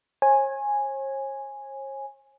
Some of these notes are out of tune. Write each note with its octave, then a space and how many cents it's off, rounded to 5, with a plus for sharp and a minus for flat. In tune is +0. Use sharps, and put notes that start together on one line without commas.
C#5 -45 G#5 -5